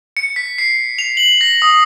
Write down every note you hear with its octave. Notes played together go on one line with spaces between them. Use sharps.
C#7
B6
C7
F7
F#7
A#6
D#6